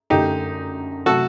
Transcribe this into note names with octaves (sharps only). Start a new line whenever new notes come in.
F#2 D3 A3 D#4 G4
C3 F#3 A3 F#4 A4